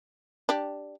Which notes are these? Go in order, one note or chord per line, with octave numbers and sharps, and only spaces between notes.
D4 G4